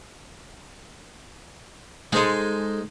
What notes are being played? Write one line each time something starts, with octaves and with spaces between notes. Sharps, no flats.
G#3 D#4 A4 C5 D#5